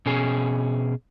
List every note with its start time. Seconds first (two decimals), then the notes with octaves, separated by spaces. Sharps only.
0.06 B2 C#4 G#4